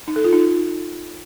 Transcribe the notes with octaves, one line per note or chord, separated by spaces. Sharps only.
D#4
A4
F4
D#4